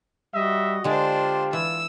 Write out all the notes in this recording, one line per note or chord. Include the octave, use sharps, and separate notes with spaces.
G3 F#4 D#5 E5
D3 G#3 D4 F4 G4 C5
E3 E6